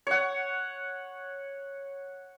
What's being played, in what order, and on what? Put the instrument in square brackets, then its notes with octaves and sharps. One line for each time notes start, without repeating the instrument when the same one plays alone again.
[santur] C#5 F#5